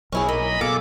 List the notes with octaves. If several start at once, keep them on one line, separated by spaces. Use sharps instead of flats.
B1 C#4 E4 G#4 C#6 F6
A#3 D#5 B5
B2 G#4 A4 F5 D6